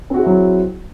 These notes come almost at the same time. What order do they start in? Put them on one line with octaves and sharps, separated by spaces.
C4 F#4 G#4 E4 F#3